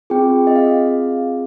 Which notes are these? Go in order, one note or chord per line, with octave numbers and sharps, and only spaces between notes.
C4 F4 G#4 G5
D#5
F5